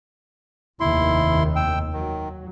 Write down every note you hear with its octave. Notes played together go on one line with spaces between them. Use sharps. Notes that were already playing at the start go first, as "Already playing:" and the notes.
F1 D#2 D#3 E4 C6
G5 E6
D#3 F#3